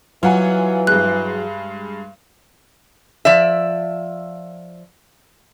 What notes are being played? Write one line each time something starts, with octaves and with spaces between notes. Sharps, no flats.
E3 F#3 F4 F#5 G#5
G2 G#3 F#6
F3 D5 E5